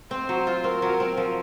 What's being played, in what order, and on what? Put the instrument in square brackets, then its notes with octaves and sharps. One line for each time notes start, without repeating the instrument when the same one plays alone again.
[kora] C4 [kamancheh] C5
[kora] F#3
F4
[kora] C4 [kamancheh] A#4
[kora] F#3
C4
F3